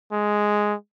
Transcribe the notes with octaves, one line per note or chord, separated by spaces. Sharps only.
G#3